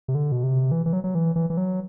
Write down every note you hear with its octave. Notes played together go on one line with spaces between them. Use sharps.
C3
D3
B2
C3
E3
E3
F#3
F#3
E3
E3
E3
F#3